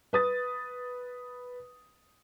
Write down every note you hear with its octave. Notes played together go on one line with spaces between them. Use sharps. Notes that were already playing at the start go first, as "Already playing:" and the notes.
B4 D#6 A6